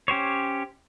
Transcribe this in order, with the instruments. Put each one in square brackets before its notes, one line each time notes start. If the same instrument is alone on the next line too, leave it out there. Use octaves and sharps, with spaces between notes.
[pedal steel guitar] C#4 G4 C5 C#5